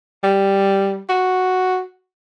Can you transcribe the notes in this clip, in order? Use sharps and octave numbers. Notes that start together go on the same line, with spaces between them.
G3
F#4